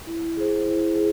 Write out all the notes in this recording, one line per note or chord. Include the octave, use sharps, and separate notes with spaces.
E4
G#4 C5
E4
G#4